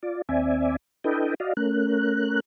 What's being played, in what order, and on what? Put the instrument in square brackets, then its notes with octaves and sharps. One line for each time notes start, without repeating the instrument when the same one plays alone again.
[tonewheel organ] F4 D5
D#2 C4 D5 E5 G#5
D4 E4 A4 B4 D#5 G5
F#4 D5 D#5 F5
A3 C#4 A#4 F#6